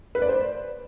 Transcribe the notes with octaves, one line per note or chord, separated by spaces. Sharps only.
B4
D5
C5